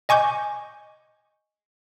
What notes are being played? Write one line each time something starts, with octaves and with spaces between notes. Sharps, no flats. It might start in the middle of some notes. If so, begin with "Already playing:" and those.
D#5 G#5 C#6 D6 G6